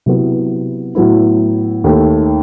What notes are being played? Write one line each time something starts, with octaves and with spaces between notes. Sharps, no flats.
C3 F#3 B3 E4
A2 F#3 B3 E4
D#2 D#3 A3